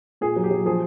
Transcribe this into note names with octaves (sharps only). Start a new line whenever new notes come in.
A#2 G#4
F#3
G4
F#3
F3 G#4